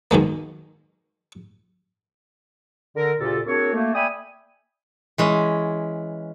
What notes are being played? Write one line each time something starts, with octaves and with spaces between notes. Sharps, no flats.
B2 D#3 G#3 A#3
D3 A#4
D2 A#2 C#3 F4 G4 A4
A#3 C4 D4 F#4 G#4 C#5
A3 A#3
D5 E5 G5 G#5 B5 D#6
E3 G#3 C#4